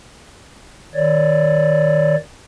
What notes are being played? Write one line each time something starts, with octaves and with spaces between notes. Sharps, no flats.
D#3 C#5 D5